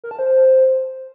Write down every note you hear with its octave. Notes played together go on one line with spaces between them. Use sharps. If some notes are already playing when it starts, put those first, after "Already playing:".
A#4
A5
C5